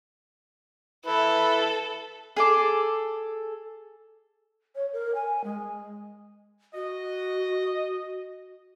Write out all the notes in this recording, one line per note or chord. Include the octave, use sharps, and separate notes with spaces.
E4 A4 B4
G#4 A4 D6
C#5
A#4
G#5
G#3
F#4 D#5